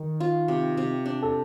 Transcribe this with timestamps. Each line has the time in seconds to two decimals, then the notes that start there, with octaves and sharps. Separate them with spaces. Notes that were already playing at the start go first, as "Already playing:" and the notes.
Already playing: D#3 D#4
0.20 F4
0.48 C3
0.77 C3
1.06 D4
1.22 A4